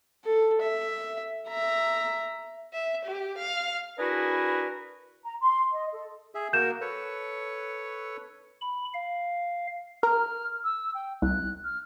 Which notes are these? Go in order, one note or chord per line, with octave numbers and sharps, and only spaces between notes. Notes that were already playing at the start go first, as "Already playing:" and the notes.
A4
E5
E5 A#5
E5
G4
F5
D4 E4 F#4 G#4 A#4 B4
A#5
C6
D#5
A4
G#4 E5
A#3 F#4 A#4 G6 E7
A4 B4 C#5
B5
F5
A#4 F6
E6
G5
C2 F#6
F6